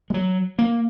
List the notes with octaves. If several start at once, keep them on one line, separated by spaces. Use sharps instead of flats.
G#3
F#3
A#3